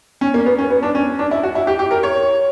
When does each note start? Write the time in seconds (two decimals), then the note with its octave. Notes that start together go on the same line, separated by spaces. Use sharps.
0.21 C#4
0.34 A#3
0.46 B3
0.58 C#4
0.70 B3
0.83 D4
0.95 C#4
1.19 D4
1.31 E4
1.43 F#4
1.55 E4
1.67 G4
1.79 G4
1.91 A#4
2.03 C#5